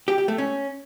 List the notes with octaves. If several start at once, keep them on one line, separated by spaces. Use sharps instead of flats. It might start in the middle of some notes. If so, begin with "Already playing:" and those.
G4
G4
A3
C#4